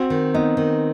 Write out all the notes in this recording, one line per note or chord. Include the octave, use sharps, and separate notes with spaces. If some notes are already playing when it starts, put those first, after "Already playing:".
Already playing: C4 F#4
D#3
B3 D#4
D#3